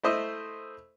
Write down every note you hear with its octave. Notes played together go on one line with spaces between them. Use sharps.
A3 E4 C5 D#5